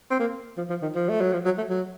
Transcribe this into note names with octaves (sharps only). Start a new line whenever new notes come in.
C4
A#3
F3
F3
D#3
F3
A3
F#3
F3
F#3
A3
F#3